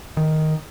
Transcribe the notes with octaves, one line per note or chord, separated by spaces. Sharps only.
D#3